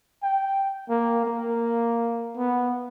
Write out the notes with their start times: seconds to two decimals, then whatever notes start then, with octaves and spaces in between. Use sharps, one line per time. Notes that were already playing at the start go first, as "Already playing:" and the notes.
0.23 G5
0.90 A#3
1.25 A#3
2.37 B3